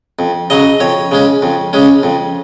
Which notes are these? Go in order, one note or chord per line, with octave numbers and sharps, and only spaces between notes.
F2
C#3 F#3 D#5
F2 C#5
C#3 G#3 C#4
F2
C#3 G#3 C#4
F2